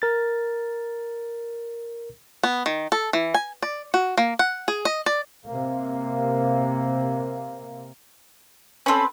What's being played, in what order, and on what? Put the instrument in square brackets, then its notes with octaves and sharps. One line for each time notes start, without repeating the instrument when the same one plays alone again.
[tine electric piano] A#4 A6
[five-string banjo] B3
D#3
A4
E3
G#5
D5
F#4
A#3
F#5
G#4
D#5
D5
[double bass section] C3 A#3
[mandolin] C4 B4 [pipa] C#4 A4